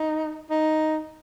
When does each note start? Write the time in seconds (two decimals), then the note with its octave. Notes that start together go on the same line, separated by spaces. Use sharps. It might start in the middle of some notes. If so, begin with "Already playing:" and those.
Already playing: D#4
0.50 D#4